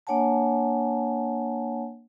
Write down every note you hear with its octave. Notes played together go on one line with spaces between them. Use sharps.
A#3 D4 C#5 F#5 G#5 A5